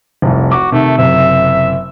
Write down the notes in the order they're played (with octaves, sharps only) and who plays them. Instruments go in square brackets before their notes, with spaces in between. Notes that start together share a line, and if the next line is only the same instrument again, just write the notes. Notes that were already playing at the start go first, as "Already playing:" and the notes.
[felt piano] F1 C2
[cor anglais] F#4 [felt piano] D6
[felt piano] C3 D#3 [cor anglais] A3
[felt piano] F#1 C3 [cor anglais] E5